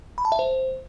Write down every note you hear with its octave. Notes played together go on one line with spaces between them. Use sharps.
B5
A5
E5
C5